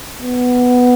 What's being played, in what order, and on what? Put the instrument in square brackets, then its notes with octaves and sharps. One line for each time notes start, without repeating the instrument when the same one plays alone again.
[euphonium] B3